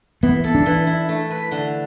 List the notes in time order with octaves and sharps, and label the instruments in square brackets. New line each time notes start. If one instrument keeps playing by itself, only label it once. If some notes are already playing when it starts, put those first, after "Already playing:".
[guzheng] E3 [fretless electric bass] B3
[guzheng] A4
[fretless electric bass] D4
[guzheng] E3
E4
A3
B4
D3